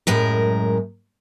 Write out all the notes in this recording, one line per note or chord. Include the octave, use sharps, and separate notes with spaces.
F#2 A2 G#3 A#4